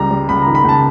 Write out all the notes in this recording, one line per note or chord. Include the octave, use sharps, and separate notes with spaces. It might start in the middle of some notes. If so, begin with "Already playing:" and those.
Already playing: C#2 G3 A#5
G3
C#2 B5
D#3 A#5
B5
C#2 A5